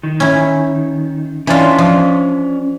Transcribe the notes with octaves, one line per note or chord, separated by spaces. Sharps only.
D#3
C#4 E4
E3 C#4 D4 F4 C#5 D5
F3